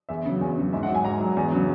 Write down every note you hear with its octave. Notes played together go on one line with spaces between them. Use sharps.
E2 E5
C#3 F#3
E2
C#3 F#3
G#2 E5
F#5
F#3
G#5
G#2 A#5
F#3
E2
C#3 F#3